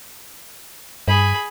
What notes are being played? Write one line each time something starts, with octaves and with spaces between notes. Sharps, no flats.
G2 G#4 B5